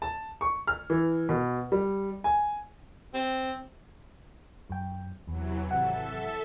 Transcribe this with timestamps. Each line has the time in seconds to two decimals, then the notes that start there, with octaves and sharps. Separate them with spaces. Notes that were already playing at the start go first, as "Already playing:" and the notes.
0.02 A5
0.41 C#6
0.67 F6
0.90 E3
1.29 B2
1.72 G3
2.24 G#5
3.14 C4
4.70 F#2 G5
5.27 E2 C3 E3 F#3
5.71 G#1 C3 A4 E5 F#5